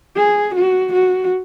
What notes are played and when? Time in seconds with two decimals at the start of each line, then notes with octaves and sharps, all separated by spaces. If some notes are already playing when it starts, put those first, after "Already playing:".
0.16 G#4
0.55 F#4
0.93 F#4